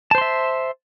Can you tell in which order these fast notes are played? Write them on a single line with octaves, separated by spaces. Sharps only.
A5 C5 C6 E5